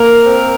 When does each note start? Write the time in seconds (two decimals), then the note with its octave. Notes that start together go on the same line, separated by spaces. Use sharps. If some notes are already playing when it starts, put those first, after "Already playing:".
Already playing: A#3 A#4
0.24 C4